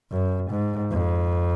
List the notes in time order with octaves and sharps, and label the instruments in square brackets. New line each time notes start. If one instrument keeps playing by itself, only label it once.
[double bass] F#2
G#2
F2